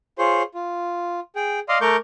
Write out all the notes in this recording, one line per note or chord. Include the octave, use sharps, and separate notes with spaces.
F4 G#4 C5 C#5
F4
G#4 G5
D5 D#5 F5 C6
A3 A#4 C#6 D6 G6